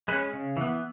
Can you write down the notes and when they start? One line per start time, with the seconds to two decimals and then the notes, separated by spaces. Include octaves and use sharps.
0.08 G#3 B4
0.12 C#4
0.33 C#3
0.57 E3 B3